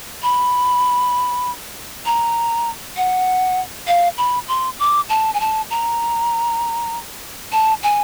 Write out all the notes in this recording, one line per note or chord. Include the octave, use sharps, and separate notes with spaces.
B5
A#5
F#5
F5
B5
C6
D6
A5
G#5
A5
A#5
A5
G#5